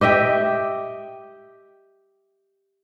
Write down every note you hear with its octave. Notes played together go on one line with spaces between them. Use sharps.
G4 D#5 E5 G5